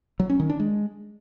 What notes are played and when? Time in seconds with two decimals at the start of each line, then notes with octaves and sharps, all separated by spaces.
0.20 F#3
0.30 C#4
0.40 D#3
0.50 D4
0.60 G#3